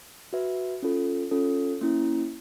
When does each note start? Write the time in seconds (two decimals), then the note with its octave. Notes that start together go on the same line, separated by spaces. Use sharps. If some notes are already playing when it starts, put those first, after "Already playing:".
0.33 F#4 B4 E5
0.82 C#4 F4 A4
1.31 C#4 F4 A4
1.81 A#3 C#4 E4